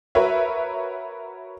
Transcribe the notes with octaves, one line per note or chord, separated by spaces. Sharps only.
F#4 A#4 B4 C#5 E5